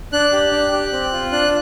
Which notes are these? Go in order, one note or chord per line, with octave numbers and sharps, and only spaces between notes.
D4 F#6
G4
D4
G4
C4
F4
D4 F#6